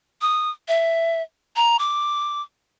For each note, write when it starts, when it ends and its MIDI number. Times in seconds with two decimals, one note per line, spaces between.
0.21 0.50 87
0.68 1.22 76
1.56 1.77 82
1.79 2.42 86